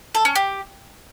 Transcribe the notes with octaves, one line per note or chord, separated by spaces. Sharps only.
A4
C#4
G4